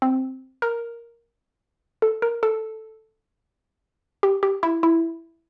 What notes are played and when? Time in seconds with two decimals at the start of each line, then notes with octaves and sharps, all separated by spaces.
0.02 C4
0.62 A#4
2.02 A4
2.22 A#4
2.43 A4
4.23 G4
4.43 G4
4.63 E4
4.83 E4